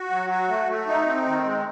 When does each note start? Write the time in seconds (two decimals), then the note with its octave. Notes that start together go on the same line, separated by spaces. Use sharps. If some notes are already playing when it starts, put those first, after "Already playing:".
Already playing: F#4
0.11 F#3
0.30 F#4
0.49 A3
0.69 A3
0.87 D#4
1.06 C4
1.26 D#3
1.45 G#3